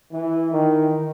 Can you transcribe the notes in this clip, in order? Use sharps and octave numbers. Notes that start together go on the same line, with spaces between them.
E3
D#3